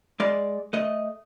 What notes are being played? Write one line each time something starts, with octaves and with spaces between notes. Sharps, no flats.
G#3 D5
A3 D#5